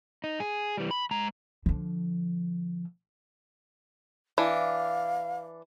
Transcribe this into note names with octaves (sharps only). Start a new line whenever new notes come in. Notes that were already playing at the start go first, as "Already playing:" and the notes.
D#4
G#4
E3 G3
B5
G#3 A#5
D3 F3
E3 D4 F5